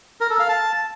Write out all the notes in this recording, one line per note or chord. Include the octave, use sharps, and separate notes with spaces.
A#4
A4
F5
A5